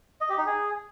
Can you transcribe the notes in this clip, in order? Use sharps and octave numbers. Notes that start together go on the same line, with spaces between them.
D#5
G4
D#4
G#4